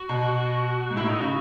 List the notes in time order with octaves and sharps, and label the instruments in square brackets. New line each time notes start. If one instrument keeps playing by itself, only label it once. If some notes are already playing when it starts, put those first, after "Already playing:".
Already playing: [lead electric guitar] F#4
[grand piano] B2
G#2
[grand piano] A2 [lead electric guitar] E4
[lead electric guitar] D#4
[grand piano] C#3 [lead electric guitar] F#4